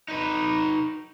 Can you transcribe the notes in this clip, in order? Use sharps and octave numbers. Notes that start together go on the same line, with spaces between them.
D#4 B4